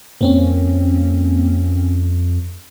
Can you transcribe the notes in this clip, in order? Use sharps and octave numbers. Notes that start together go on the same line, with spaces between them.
F2 A#3 C4 C#4